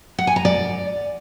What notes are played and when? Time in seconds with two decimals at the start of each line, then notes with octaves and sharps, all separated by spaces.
0.18 F#5
0.27 G#5
0.36 A#5
0.45 D5